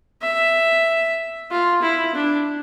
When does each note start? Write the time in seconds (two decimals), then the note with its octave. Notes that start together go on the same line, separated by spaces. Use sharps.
0.22 E5
1.51 F4
1.82 E4
2.15 D4